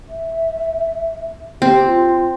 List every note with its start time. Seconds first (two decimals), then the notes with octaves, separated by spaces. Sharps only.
0.09 E5
1.62 C4 G4
1.87 F4